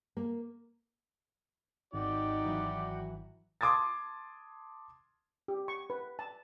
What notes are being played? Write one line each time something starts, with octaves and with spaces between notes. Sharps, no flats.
A#3
G#1 D#4 F#4 D5 G5
E3 F#3
A5 C6 D6 D#6 G#6 A6
G4
C#6
B4
A5